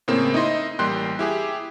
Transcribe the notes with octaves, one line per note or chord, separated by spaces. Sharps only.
A2 C#3 A#3 C4
D#4 E4 D#5 C6
A1 G3 A#3 G5 C6 F#6
E4 G4 G#4